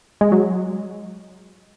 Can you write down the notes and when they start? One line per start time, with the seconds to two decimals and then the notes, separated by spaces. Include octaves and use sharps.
0.21 G#3
0.32 F#3